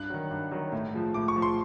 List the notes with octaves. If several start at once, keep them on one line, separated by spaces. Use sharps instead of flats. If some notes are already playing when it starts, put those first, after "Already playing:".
Already playing: G2 F#6
D#3 F#3
G2
D#3 F#3
A2
F3 G#3
A2 D6
C#6
F3 G#3
C6